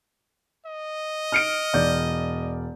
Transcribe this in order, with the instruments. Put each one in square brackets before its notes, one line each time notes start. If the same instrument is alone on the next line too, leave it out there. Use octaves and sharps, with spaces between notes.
[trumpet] D#5
[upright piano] F6 C#7 D7
E1 D5 G6